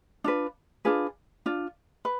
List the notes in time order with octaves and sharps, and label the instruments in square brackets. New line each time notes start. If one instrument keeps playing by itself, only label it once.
[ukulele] D4 F4 B4
D4 F4 G#4 B4
D4 F4
B4